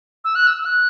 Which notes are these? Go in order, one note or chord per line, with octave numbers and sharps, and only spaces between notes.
E6
F#6
E6
E6
F#6